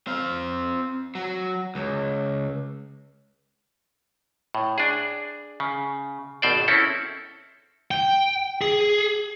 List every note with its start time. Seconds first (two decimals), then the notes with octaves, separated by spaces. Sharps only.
0.07 C4 F5
1.15 F#3
1.75 C#2
4.55 A2
4.78 D4 G#4
5.60 C#3
6.42 G#1 B2 C5 D5
6.68 C4 C#4 E4 A4
7.91 G5
8.61 G#4